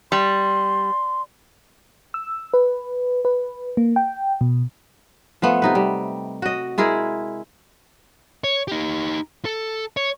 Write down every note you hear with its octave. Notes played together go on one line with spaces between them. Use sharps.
G3 C6
E6
B4
B4
A#3
G5
B2
F3 A3 B3
C3 D#4 B4
G3
F#4 D#5
G#3 E4 G#4 A#4
C#5
D#4 G4
A4
C#5